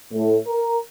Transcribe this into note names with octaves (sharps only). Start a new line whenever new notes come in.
A2
A#4